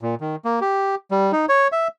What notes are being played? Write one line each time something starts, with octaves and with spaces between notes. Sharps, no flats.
A#2
D#3
A#3
G4
G3
D#4
C#5
E5